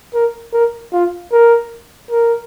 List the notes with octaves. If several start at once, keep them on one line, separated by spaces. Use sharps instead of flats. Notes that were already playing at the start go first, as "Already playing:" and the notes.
A#4
A#4
F4
A#4
A#4